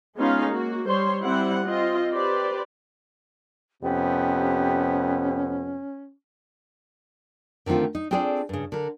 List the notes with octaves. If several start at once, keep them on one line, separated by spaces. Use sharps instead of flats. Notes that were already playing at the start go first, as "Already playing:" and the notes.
G#3 B3 C#4 D#4 F4 F5
A#3 F#4
G3 C5 C#5 C6
G3 C4 E4 F#5
C4 F4 D#5
G4 B4 C5 D5
F2 C3 B3 C#4 G4
D3 D#3 A3 C4 F4
D#4
C4 D4 F4 G#4 A4 D5
G2 C#3
D3 A#4